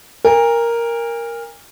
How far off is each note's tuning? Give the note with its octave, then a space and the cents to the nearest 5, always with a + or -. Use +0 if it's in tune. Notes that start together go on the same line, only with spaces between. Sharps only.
A#4 +0 G#5 -40